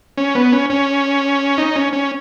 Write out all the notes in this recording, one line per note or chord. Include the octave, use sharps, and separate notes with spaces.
C#4
B3
C#4
C#4
D#4
C#4
C#4